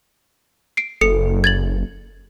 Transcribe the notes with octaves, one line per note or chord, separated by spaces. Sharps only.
C7 D7
F#1 A4 C#7
G#6 A6 F#7